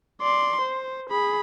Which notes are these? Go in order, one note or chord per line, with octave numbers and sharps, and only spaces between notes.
D5 C6
C5
G#4 B5